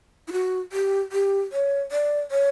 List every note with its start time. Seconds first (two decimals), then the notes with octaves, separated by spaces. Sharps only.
0.28 E4
0.32 F#4
0.72 G4
1.12 G4
1.52 C#5
1.92 D5
2.31 C#5